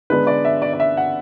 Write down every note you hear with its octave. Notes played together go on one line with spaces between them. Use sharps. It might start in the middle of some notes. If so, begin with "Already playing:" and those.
D3 G#3 B3 D4 B4
D5
E5
D5
D5
E5
F#5